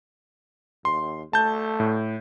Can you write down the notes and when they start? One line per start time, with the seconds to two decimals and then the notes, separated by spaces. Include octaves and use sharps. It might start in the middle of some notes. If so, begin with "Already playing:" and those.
0.85 D#2 C6
1.33 A3 A5 G6
1.80 A2